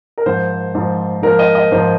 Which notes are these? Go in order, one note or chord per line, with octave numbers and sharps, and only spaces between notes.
A#4
G#2 F3 C5
G#2 F3
G#2 F3 A#4
D#5
D#5
G#2 F3 C5